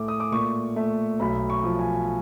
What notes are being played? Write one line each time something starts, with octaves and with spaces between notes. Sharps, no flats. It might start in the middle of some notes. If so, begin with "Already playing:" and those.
Already playing: A2 A3 D6
D#6
D6
A#2 C#6
A3
B1 B5
C#6
F3
G#5